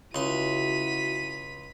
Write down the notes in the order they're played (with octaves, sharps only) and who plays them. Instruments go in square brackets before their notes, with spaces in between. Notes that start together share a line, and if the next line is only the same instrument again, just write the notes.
[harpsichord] C#2 C6 [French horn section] C#3 E4 F#4 [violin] B6 D#7